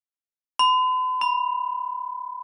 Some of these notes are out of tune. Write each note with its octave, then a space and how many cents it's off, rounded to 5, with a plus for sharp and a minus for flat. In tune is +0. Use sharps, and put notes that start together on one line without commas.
B5 +45
B5 -15